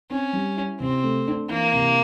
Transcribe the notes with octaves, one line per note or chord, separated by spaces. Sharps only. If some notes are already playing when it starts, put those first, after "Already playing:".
C4 C#4
G3
E4
C3 C4
A3
D4
E3 A#3
C3